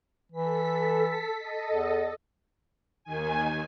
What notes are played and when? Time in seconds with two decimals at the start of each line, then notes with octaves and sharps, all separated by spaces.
0.32 E3 A4 B6
1.39 A4 D#5
1.71 E2
3.04 D#2 D#3 G#5